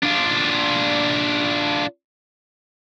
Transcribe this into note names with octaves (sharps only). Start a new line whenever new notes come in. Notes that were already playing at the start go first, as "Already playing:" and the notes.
D4 F4